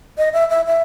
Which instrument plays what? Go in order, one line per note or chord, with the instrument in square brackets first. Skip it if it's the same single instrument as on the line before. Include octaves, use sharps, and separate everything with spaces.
[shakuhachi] D#5
E5
E5
E5